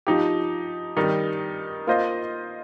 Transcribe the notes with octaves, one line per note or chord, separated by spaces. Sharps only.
F3 D#4 G4
D#3 G3 D#4
A#3 F4 C5 D#5